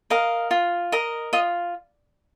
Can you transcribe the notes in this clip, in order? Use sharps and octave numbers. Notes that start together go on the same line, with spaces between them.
A#4 D#5 F5
F4
A#4 D#5
F4 D#5